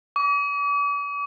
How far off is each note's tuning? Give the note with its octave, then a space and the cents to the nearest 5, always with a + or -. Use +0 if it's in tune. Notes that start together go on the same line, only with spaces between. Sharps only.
D6 -40